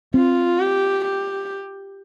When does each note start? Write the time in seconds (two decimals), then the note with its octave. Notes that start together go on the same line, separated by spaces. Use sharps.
0.14 C4 F4
0.59 G4
1.04 G4